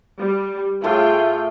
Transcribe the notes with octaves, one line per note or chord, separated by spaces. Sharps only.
G3
A2 A3 F4 G#4 G5